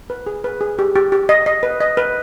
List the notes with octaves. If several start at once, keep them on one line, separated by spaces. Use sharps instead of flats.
B4
G#4
B4
G#4
G4
G4
G4
D#5
D#5
B4
D#5
B4